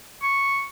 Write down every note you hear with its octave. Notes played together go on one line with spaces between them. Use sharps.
C#6